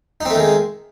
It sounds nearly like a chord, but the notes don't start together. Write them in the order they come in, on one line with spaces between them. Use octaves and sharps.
D#4 C4 A3 D#3 G#3